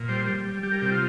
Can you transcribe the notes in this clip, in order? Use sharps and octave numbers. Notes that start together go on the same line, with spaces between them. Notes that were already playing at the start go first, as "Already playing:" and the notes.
Already playing: A#2
G3 C5
G3
G3
G3 G4
A#4
C3 G4
F4